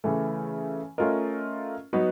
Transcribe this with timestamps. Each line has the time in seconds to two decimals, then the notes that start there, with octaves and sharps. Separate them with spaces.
0.04 C#3 E3 A3
0.98 A3 C#4 F4 A#4 D#5
1.93 F#3 B3 D#4 F#4 B4